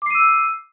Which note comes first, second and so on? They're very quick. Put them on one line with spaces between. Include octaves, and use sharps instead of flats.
D6 C7 D#7 E6